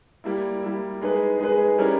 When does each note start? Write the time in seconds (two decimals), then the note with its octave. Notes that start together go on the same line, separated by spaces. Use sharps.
0.24 G3 A#3 E4
0.63 G3 A#3 E4
1.01 G#3 D#4 G#4 B4
1.39 G#3 D#4 G#4 B4
1.78 G3 C#4 E4 A#4